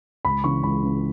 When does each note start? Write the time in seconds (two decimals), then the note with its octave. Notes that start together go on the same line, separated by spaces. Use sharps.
0.25 C#2 B5
0.44 C#3 E3 C#6
0.63 C#2 B5
0.82 C#3 E3